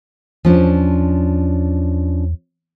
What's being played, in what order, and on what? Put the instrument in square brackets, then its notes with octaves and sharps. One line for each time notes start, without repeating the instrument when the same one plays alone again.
[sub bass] E2 [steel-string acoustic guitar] F3 C#4 D4